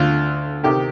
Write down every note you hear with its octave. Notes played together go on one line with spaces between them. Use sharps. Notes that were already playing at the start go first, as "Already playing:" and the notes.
Already playing: D2 D3 F4
C3 D#3 G4